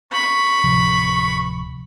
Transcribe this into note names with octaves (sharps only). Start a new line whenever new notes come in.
B5 C#6
D1 C3 F3